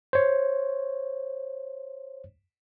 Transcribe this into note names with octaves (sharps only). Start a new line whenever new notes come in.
C5 C#5